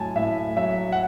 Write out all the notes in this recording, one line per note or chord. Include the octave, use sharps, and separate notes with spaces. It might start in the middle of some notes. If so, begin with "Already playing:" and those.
Already playing: A2 F#3 G#5 A5
A2 E5
F#3 E5
F#5